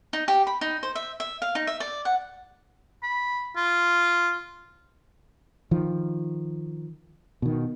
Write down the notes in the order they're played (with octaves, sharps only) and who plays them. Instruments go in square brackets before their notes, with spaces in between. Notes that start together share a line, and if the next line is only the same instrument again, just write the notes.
[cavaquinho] D#4
G4
B5
D#4
C5
E5
E5
F5
D#4
E5
D5
F#5
[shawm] B5
F4
[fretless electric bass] D#3 F3
B2 D#3